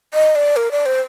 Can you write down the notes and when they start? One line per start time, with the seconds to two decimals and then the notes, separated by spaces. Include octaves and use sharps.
0.14 D#5
0.35 D5
0.56 A#4
0.71 D5
0.86 C5